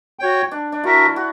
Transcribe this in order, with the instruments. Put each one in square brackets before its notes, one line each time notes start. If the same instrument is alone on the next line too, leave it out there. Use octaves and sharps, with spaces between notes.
[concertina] F#4 C#5 G5
[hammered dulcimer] D4
D4
[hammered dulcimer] E4 [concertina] F#4 A#4 E5
[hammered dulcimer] F#4